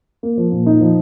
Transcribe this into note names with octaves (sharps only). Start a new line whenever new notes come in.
A#3
F3
A#2
D#4
F3